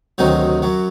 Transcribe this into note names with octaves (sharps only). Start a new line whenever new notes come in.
D2 C3 D#3 F#3 D#4
F#2 F#3